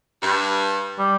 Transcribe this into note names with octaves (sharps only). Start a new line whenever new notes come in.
G2
G3